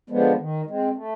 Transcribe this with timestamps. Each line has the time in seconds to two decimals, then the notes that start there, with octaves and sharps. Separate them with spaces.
0.10 D3 F3 G#3 B3
0.39 D#3
0.66 G#3 C4
0.95 A3